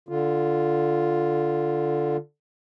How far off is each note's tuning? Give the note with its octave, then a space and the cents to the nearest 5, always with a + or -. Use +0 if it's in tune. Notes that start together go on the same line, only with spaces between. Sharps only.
D3 +0 F4 +0